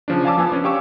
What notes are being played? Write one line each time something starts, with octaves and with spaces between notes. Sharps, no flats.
C#3 F3 C#4 D4
F5 G#5 A5 D6 E6
F3 B3 G#5 E6
C#4 D4
G4 C#5 F5 C#6 D6 E6